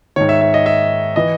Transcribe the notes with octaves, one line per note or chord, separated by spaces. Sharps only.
G#2 D#3 C#5
E5
E5
D#5
E5
E3 D#5